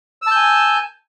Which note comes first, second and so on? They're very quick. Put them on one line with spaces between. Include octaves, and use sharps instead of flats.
E6 A5 G6 G#5